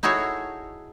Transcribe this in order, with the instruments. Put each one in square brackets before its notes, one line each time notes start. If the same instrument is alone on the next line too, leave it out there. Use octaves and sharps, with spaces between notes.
[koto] D#4 E4 F#4 G#4 A4 C#5